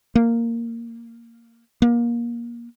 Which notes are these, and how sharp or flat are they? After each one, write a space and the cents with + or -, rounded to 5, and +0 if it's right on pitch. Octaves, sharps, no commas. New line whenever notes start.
A#3 -10
A#3 +25